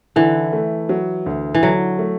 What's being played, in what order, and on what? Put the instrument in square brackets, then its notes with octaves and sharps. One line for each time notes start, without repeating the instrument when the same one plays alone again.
[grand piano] D3 [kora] E3
[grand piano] A3
F#3
D2
[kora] E3
[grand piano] D3 [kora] F#3
[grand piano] A3